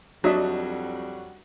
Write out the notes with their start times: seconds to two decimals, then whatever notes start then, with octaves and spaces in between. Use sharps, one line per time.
0.24 F2 F#3 G3 D4 F#4 D#5 E5